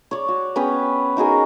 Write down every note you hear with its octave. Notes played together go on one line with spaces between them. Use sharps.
C#5 D5
F#4
B3 C#4 B4 G5
D#4 F#4 G#4 A#4